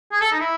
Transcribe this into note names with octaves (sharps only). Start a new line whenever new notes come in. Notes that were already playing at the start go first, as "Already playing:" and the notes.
G#4
A4
D#4
E4